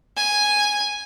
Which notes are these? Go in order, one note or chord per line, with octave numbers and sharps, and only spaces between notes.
G#5